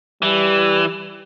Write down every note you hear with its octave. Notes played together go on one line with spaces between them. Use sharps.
E3 G3